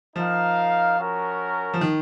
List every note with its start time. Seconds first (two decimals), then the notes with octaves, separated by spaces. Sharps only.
0.16 F3 D#4 A#4 F5
0.99 C#4 F#4 A#4
1.74 F3
1.81 D#3